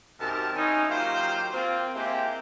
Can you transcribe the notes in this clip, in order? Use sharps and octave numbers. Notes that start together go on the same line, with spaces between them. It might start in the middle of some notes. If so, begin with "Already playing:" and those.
F#2 C3 D#3 A#4 A5
C#4 D#4 E4
D#3 F#3 A#3 F4 G4 C5
A#3 C4 F4
G#3 A#3 C4 E4 G4